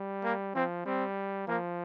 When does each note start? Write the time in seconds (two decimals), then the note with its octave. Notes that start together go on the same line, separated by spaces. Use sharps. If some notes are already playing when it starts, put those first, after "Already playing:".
Already playing: G3
0.24 A#3
0.55 F3 C4
0.86 G3 C4
1.48 F3 A#3